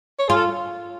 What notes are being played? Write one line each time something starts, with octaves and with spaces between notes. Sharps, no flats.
C#5
F4 G#4
A4